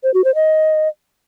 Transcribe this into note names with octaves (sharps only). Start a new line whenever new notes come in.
C5
F#4
C5
D#5